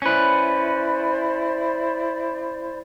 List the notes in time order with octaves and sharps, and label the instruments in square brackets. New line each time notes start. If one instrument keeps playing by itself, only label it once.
[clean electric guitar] C#4 B4 [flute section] E4 C5 D5